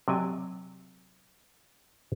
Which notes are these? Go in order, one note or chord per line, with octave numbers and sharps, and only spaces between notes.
C3 F#3 D5 D#5 G#5